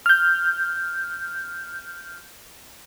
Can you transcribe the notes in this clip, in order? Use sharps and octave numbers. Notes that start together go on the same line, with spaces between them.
F6 G6